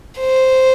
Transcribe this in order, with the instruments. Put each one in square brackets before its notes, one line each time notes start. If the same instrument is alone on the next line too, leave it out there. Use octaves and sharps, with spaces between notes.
[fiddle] C5